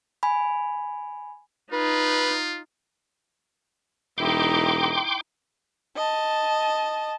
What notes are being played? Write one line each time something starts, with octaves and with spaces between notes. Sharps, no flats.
G#5 B5
D#4 F4 B4
E1 D#4 E4 G5 C6 D6
D#5 A5